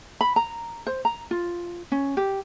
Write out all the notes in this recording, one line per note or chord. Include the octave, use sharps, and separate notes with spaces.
B5
A#5
C5
A#5
F4
C#4
G4